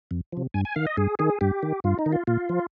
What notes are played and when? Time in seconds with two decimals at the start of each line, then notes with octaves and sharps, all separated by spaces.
0.11 F2
0.32 C3 F3
0.54 G2 G#5
0.65 G#5
0.76 D#3 F5
0.87 D#5
0.97 G2 G#4
1.19 D#3 G#4
1.41 G2 G4
1.63 D#3
1.84 G2 F4
1.99 D#4
2.06 D#3
2.12 F4
2.27 A#2 F4
2.49 F3